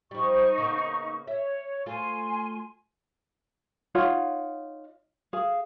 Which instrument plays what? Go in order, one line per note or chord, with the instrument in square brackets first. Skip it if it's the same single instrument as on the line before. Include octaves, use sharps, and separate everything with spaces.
[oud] F3 G3 [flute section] D#4 C#6
[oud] C#3 A#3 B3
[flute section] C#5 [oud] E5
[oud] A3 F4 A4 [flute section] G#5 C6
[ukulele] D#4 F4 C#5 F#5
G#4 F5